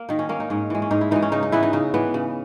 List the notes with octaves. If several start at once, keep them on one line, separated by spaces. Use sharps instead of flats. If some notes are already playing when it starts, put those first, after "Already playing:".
Already playing: A#3
D#3 D#4
C#4
A#3 C#4
D#4
G#2 C#4
E3 G#3
C#4
G#2 D#4
E4
E3 G#3 D#4
C#4
C#3 D#4
D#4
E3 B3 E4
D#4
C#3 D#4
E3 B3
C#3